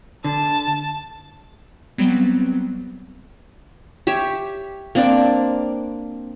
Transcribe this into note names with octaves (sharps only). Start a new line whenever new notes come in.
D3 A5
F#3 G3 B3 C4
G4 C#5 E5
A#3 C4 D4 D5